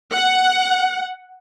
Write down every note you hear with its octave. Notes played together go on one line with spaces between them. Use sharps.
F#5